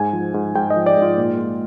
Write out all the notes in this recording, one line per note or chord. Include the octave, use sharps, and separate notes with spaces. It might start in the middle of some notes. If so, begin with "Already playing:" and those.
Already playing: G#2 G#5
F3
G#2
G#2 G5
D#5
F3
D5
G#2
F4
A#2
G#3